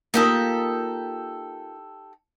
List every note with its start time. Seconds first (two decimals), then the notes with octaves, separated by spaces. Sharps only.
0.14 A#3 D#4 F4 G4 A4 A#4